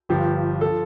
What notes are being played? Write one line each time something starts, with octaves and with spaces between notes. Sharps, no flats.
G1 G2 F3 G4
F3 A4